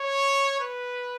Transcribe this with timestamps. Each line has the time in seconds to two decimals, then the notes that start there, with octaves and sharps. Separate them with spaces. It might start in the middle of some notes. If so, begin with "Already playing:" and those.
Already playing: C#5
0.60 B4